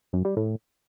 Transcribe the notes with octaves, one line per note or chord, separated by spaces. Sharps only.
F#2
G3
A2